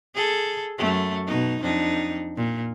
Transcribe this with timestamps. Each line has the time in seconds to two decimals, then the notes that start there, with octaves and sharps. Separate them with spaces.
0.15 G#4 A4
0.78 F#2 A3
1.27 B2 D#4
1.62 F2 D4 D#4
2.37 A#2